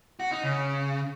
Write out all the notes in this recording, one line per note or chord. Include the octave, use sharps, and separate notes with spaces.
F#4
D#4
C#3